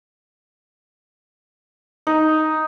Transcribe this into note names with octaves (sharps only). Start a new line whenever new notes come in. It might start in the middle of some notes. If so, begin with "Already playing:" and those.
D#4